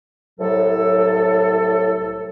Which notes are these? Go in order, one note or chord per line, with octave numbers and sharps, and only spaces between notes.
C2 A2 F#3 A4